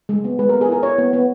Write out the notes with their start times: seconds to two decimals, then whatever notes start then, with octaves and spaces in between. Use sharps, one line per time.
0.09 G#3
0.24 B3
0.39 G#3 B4
0.49 B3 A#4
0.61 G#4
0.69 E4 A#4
0.83 E4 C#5
0.98 B3
1.13 B3